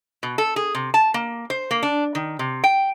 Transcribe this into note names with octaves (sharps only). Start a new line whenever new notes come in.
B2
A4
G#4
C3
A5
A#3
C5
A#3
D4
D#3
C3
G5